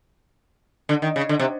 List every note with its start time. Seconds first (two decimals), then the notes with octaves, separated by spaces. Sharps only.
0.89 D3
1.02 D#3
1.16 C#3
1.29 D3
1.39 C3